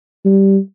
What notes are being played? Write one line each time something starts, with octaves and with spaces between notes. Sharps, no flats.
G3